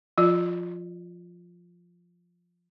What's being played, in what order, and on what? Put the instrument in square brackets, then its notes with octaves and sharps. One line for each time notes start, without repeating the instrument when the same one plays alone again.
[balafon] F3 F4 D5